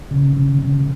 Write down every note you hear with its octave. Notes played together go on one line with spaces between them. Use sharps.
C#3
C#3
C#3